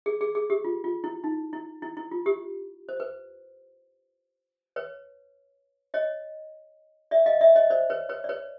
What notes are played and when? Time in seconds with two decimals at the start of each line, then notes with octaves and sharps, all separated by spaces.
0.06 G#4
0.21 G#4
0.35 G#4
0.50 G4
0.65 F4
0.84 F4
1.04 E4
1.24 D#4
1.53 E4
1.82 E4
1.97 E4
2.11 F4
2.26 G4
2.89 C5
3.00 B4
4.76 B4 C#5
5.94 C#5 D#5
7.11 D5 E5
7.26 D#5 F5
7.41 D5 E5
7.56 C#5 D#5
7.70 C5 D5
7.90 B4 C#5
8.09 B4 C#5
8.24 D5
8.29 B4 C#5